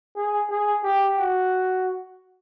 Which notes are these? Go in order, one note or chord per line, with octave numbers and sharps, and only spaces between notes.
G#4
G#4
G4
F#4